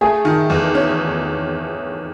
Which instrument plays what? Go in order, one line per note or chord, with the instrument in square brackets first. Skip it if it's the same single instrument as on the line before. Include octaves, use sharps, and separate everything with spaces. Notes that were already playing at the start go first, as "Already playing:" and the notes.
[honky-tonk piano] A3 [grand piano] G#4
[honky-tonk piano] D#3
E2
C#4